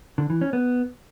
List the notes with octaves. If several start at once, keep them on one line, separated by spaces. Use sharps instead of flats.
D3
E3
C#4
B3